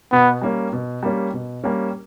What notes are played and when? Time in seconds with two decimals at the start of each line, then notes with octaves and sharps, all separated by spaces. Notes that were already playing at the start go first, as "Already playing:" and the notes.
0.11 B2 B3
0.42 G3 A#3 C#4
0.73 B2
1.03 G3 A#3 C#4
1.33 B2
1.64 G3 A#3 C#4